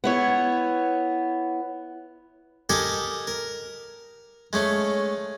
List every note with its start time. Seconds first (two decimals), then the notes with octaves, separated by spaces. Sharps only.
0.04 B3 E4 C#5
2.69 G4 A4 A#4 D#5 G#5
3.27 A#4
4.53 G#3 A3 C#4